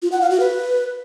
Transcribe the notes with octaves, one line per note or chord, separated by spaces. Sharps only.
F4
F#5
F5
F#4
B4